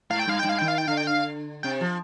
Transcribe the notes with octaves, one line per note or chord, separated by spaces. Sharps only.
G#2 F5
G5
G2 F5
G5
G2 F5
D#3 G5
F5
G5
D3 F5
G5
F5
C3 G5
F3